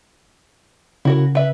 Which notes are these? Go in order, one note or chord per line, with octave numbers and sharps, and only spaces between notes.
C#3 E4 F#4 A#4
B4 E5